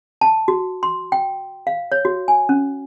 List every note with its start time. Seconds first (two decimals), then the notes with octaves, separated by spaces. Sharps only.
0.21 A5
0.48 F#4
0.83 C6
1.12 G5
1.67 F5
1.92 C#5
2.05 F#4
2.28 G#5
2.49 C#4